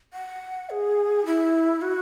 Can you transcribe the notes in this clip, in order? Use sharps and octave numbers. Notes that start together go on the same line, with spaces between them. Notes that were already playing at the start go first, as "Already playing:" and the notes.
F#5
G#4
E4
F#4